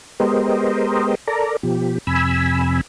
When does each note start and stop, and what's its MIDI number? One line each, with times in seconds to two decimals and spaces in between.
0.20 1.15 56
0.20 1.15 59
0.20 1.15 67
0.20 1.15 70
0.20 1.15 72
0.20 1.15 75
1.28 1.56 69
1.28 1.56 70
1.28 1.56 74
1.28 1.56 82
1.63 1.98 47
1.63 1.98 53
1.63 1.98 67
2.07 2.81 41
2.07 2.81 48
2.07 2.81 80
2.07 2.81 83
2.07 2.81 88